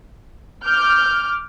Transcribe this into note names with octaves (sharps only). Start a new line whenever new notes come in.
D6 F6 G6